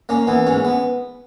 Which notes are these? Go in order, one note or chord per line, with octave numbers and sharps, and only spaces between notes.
A#3 C#4
E3 B3
G#2 C#4
B3